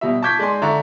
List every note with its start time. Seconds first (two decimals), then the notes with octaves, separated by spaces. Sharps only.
0.01 B2 G3 E5
0.22 A5 C#6 D6 G6 G#6 B6
0.39 G#3 D5 G#5 C6
0.62 D3 D5 E5 A#5 C#6